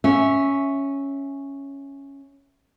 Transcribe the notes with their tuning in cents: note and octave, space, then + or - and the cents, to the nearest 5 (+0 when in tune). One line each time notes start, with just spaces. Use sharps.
C#4 +0 E5 +0